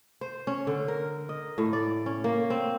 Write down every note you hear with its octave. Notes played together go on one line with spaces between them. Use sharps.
C5
C#4
D3
A#4
D#5
A2
D5
C#4
A#3
C4